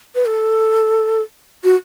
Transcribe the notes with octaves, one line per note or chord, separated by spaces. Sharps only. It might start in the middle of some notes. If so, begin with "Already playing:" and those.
B4
A4
F#4